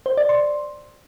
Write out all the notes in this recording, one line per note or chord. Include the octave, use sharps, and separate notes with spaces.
C5
D5
C6